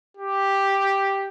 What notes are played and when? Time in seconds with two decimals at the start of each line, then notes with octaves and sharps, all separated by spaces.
0.17 G4